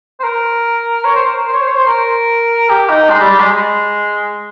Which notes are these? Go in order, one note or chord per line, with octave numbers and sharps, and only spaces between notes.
C5
A#4
C#5
C5
A#4
C5
C#5
C5
C#5
C5
A#4
G4
D#4
G#3
G3
G3
G#3
G#3